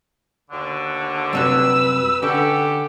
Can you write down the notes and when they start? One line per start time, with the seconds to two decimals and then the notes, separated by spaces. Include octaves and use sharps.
0.51 D#2 B2 D3
1.33 F#2 C3 G3 B4 E6
2.23 D3 C#4 G4 A4 B4 F#5